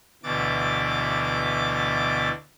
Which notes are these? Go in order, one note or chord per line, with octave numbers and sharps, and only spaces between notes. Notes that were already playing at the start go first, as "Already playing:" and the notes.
D2 B2 E3 D6 A6